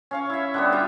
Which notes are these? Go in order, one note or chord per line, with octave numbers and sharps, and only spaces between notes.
C#4 F5 C#6
E4 E5
D3 G3 B3
F4 G4 E5